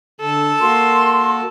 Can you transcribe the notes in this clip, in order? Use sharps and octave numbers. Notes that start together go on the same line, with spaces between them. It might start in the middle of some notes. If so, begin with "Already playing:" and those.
D3 A4
A#3 F#4 A#4 C6